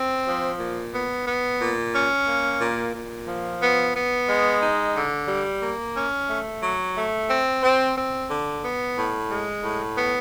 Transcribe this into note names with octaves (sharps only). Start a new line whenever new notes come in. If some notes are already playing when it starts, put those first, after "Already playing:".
Already playing: C4
F3
A#2
B3
B3
A#2
C#4
A#3
A#2
A#2
F3
B3
B3
G#3
D#4
D3
G3
A#3
C#4
A3
F#3
A3
C4
C4
C4
D3
B3
A2
G#3
A2
B3